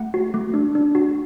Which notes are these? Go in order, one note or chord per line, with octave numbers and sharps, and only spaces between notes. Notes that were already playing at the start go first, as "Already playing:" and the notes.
Already playing: A3 F#5
F#4
A3
D4
D4
F#4